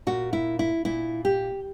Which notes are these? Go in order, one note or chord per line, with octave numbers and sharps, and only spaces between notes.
A#2 F#4
E4
E4
A#2 E4
G4